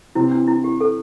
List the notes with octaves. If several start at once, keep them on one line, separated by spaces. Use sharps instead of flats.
C3 E3 C4 E4
D4
E4
G4
A4